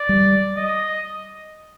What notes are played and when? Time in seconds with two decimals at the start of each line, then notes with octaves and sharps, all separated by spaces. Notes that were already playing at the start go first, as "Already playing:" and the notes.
Already playing: D5
0.09 G3
0.57 D#5